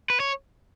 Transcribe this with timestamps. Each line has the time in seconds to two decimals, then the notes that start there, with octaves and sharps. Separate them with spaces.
0.10 B4
0.20 C#5